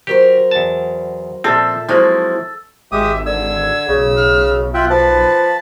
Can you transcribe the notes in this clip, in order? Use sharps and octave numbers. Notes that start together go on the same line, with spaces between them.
F#3 G4 A#4 C5
E2 A5
A#2 F3 C4 A4 E5
F3 F#3 G#3 A#3 C4 E4
G#1 G#3 G4 E5 D#6
D3 E6 G#6
B1 C#3
F6
F4 E5 G5 F#6
F3 B4 A5